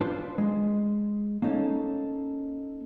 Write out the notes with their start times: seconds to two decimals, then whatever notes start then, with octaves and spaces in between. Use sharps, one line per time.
0.01 D4 F4 B4 C5
0.38 G#3
1.42 A#3 C#4 D#4 A4